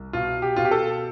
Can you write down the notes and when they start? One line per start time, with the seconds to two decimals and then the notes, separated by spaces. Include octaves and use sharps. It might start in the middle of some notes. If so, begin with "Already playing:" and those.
Already playing: C2
0.13 B2 F4
0.42 G4
0.56 B2 F4
0.65 G4
0.71 A4